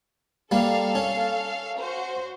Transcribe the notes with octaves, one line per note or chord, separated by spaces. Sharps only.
G3 A#3 A4 F5
C#4
F#4 C5